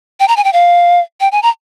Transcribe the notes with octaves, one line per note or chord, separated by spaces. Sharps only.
G5
A#5
G#5
G5
F5
G5
G#5
A#5